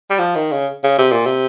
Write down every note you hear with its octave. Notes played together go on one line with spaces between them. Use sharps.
G3
F3
D#3
C#3
C#3
C3
A#2
C3